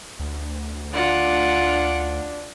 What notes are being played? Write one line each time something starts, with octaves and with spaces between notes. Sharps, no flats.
D2
D4 F4 F#5 D6